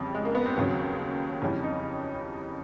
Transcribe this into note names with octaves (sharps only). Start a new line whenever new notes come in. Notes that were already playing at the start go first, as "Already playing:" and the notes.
Already playing: F2 C#3 E3 G3
G#3
A#3
B3
C4
D#2 C#3 F#3
F2 C#3 E3 G3 C#4
D#4